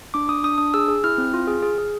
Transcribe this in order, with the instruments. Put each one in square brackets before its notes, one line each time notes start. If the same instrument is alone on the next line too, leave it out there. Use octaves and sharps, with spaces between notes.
[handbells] D4 D6
D4 D#6
D4 D#6
D4 D#6
G#4 E6
G#4
E4 F6
C4
F4
G#4
G#4
G#4